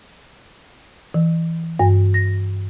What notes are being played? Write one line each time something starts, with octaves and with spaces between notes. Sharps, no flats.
E3
G2
A#6